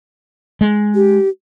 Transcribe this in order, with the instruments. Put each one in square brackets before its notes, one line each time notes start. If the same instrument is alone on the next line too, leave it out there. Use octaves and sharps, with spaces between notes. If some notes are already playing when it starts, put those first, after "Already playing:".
[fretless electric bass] G#3
[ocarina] G4